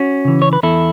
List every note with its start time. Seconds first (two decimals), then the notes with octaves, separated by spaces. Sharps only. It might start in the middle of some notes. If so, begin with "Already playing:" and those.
Already playing: C#4 F#4
0.25 C#3 E3
0.42 C#5
0.53 B4
0.63 E2 E4 A4